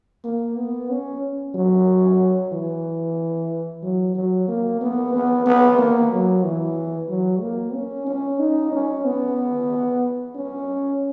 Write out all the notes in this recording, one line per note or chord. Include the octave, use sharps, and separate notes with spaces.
A#3
B3
C#4
F#3
E3
F#3
F#3
A#3
B3
B3
B3
A#3
F#3
E3
F#3
A#3
C#4
C#4
D#4
C#4
B3
C#4